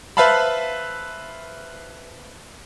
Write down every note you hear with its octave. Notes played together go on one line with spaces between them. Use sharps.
B4 C5 E5 F5 A5 B5